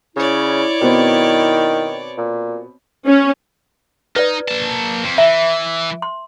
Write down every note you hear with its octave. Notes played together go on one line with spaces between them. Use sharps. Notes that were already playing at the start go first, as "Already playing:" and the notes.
C#3 E4 C#5 D5
B2 D#3 B3 C4
A#2
C#4
D#4 B4 D5
A#3 A5
F2
E3 E5
C6